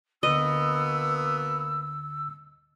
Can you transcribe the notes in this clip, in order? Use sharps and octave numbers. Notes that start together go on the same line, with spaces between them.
D2 B2 D3 A#3 B3 D#5 E6